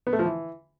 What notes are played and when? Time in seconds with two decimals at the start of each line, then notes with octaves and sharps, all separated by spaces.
0.07 B3
0.13 A3
0.19 F3
0.25 E3